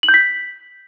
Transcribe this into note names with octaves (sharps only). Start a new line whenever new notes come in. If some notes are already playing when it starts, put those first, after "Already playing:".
F#7
G6
B6